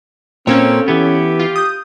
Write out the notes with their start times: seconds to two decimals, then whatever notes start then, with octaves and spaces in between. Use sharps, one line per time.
0.47 A#2 A#3 C4 C#4 A4 C#5
0.88 E3 B3 G4
1.39 F4
1.56 D#6 G6